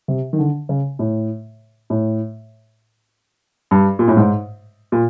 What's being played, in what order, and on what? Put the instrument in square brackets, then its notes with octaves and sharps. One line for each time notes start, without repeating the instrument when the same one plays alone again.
[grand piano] C3
D#3
D3
C#3
A2
A2
G2
A#2
A2
G#2
A#2